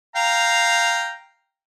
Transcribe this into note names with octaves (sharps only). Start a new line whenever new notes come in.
F5 G5 A#5